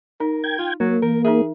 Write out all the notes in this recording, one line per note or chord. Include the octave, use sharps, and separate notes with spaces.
D#4 A#4
G5 G#6
F4
F#3 A#3
E3 A#4
D#4 G#4 A#4 E5